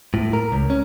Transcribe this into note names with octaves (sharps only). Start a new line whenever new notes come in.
A2
A#4
C#2
C#4